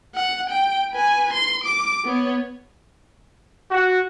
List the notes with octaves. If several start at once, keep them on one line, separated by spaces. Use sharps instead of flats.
F#5
G5
B4 G#5
C6
D6
B3 C#5
F#4